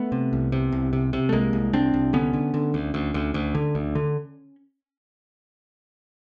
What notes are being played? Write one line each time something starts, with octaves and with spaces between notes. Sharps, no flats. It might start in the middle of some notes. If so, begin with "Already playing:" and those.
Already playing: A3 B3
C3
C2
C3
C2
C3
C3
A3
C2 G#3 A#3
C2
C2 C4 D4
C2
D3 B3 C#4
D3
D3
D2
D2
D2
D2
D3
D2
D3